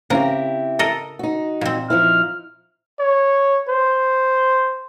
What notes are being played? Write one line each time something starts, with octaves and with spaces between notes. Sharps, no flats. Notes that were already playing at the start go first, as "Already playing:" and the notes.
C#3 C4 E4 G4 A#4 A#5
A4 A#4 D#5
D#4 F#4
A#2 C4
F3 D#4 E4 F6
C#5
C5